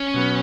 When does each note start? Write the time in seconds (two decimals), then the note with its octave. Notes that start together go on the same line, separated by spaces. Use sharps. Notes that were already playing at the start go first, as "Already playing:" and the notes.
Already playing: C#4
0.14 B2 F#3 B3